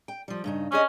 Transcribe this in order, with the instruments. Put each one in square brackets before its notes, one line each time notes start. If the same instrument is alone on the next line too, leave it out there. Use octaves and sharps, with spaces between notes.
[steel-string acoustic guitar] G5
F3 G3
G2 C#3 D#4
[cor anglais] C#4 [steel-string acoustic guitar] D4 G#4 D#5